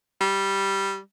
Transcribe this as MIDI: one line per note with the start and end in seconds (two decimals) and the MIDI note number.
0.21 0.99 55